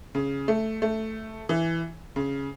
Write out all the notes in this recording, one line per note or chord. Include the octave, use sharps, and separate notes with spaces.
C#3
A3
A3
E3
C#3